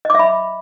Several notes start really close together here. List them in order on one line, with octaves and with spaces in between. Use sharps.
D#5 D6 E5 B5